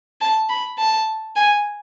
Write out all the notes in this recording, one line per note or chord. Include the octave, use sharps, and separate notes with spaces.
A5
B5
A5
G#5